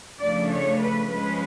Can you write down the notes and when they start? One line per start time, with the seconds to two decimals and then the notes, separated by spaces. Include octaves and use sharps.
0.20 C#3 F3 A3 D4 D5
0.50 C#5
0.80 B4
1.09 F3 G#3 C#4 B4